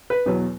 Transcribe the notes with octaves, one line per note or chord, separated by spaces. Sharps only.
B4
E2 B2 F#3